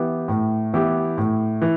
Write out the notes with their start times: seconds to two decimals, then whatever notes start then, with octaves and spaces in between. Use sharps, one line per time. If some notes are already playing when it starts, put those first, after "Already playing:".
Already playing: E3 B3 E4 G4
0.28 A2
0.74 E3 B3 E4 G4
1.18 A2
1.62 E3